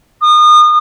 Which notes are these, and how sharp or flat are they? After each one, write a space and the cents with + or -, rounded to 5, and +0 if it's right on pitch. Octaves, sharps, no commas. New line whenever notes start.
D#6 -35